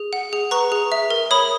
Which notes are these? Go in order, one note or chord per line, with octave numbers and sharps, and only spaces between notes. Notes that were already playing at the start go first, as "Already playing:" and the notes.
Already playing: G#4
F#5
G#4
B4 A#5 C#6
G#4
E5
A#4
C#5 B5 D#6